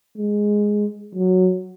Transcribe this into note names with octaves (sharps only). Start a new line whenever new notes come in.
G#3
F#3